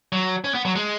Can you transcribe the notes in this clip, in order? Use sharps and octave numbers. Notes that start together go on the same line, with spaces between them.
F#3
C#4
B3
F#3
G#3